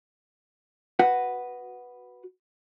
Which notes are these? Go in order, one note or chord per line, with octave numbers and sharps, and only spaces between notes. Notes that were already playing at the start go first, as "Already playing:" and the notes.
F#4 B4 F#5